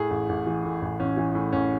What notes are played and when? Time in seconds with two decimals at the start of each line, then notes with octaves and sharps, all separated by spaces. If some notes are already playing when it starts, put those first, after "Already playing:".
Already playing: A2 G#4
0.11 A1
0.29 A1
0.47 E3
0.65 A2
0.82 A1
1.00 A1 C#4
1.17 E3
1.35 A2
1.53 A1 C#4